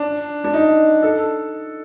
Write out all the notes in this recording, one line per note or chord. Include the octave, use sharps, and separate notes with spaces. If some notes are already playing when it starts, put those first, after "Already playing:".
Already playing: D4
D4
D#4
A4